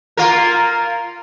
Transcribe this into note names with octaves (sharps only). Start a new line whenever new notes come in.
A#3 F4 A#4